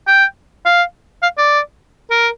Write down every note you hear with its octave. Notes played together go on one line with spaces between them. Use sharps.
G5
F5
F5
D5
A#4